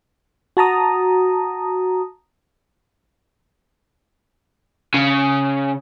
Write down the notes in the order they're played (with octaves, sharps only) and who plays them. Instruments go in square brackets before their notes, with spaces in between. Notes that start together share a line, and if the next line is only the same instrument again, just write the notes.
[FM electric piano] F#4 A5 A#5 D#6
[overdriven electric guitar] C#3